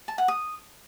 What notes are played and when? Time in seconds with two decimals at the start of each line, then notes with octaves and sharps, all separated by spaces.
0.08 A5
0.18 F#5
0.28 D#6